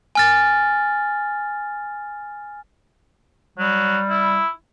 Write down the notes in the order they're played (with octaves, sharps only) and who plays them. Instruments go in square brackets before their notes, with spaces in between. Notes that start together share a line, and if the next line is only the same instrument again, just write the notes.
[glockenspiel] G#5 F6 A6
[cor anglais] F#3 [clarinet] G3
[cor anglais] E4